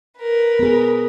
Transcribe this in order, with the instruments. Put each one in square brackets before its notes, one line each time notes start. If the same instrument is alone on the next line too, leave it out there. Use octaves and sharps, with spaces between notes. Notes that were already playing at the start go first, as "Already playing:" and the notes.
[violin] A#4 B4
[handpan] B3 G#4